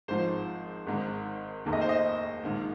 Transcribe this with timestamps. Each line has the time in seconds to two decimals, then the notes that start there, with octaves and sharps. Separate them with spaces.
0.08 G#1 G#2 F3 C5
0.87 G#1 G#2 D#3
1.65 F1 D#2 D#3
1.73 D#5
1.81 C5
1.89 D#5
2.43 A#1 G#2 D#3